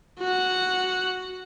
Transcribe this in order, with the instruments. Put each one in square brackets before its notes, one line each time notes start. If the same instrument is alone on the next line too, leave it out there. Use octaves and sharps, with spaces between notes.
[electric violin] F#4 F#5